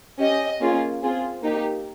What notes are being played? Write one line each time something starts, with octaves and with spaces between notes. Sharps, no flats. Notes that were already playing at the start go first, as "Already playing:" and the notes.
C#4 G4 D#5
A#3 C#4 F4 G#4
C4 F4 G#4
A#3 D#4 G4